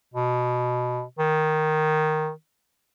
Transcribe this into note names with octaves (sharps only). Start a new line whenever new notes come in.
B2
D#3